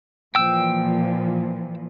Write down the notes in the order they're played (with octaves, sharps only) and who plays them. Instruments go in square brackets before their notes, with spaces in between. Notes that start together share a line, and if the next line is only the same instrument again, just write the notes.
[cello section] A#2 E3 F3 [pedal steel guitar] G5 E6